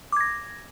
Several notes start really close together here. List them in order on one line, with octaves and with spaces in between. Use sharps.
D6 G#6 A#6